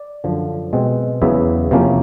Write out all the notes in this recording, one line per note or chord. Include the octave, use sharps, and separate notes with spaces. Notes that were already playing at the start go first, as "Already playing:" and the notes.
Already playing: D5
F#2 D3 F3
B2 G#3 C4
E2 C#3 F#3 B3 E5
E2 C3 F3 A#3 C#4